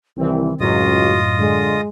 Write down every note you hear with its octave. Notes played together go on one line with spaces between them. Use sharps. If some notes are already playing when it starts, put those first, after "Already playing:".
C2 D#3 E3 C4
C#2 F#2 A2 F#3 F4 F#4 D#5 D#6
D3 G#3